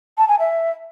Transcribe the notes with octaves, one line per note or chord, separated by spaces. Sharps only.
A5
G#5
E5